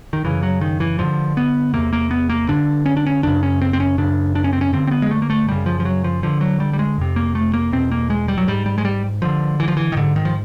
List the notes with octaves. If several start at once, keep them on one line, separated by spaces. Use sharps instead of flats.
D#3
F#2 C#3 E3
F#3
D#3
E3
G2 D3 F3
B3
E2 C3 A#3
A#3
B3
A#3
G2 D3 D4
C#4
D4
C#4
F#2 C#3 D4
C#4
C4
C4
C#4
F#2 C#3 D4
D4
C#4
C4
C#4
G2 D3 C4
C4
B3
G#3
A3
A#3
A3
F#2 C#3 G3
F3
F3
F#3
F3
G2 D3 F3
F#3
G3
G3
G#3
F2 C3
A#3
A3
A#3
E2 B2 C4
A#3
G#3
G3
F#3
G#2 G3
G3
G#3
G3
G2 D3 F3
E3
F3
E3
D#3
G#2 D3
D#3
F3